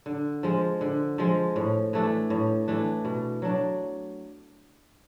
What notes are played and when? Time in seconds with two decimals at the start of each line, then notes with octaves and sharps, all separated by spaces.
0.06 D3
0.43 F3 G#3
0.81 D3
1.18 F3 G#3
1.56 A2
1.93 E3 A3 D4
2.30 A2
2.68 E3 A3 D4
3.05 B2
3.42 F#3 A3 D4